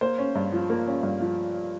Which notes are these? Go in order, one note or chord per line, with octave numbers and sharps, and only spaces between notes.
A#3 C5
C#4
G2
F3
A#3
C#4
G2
F3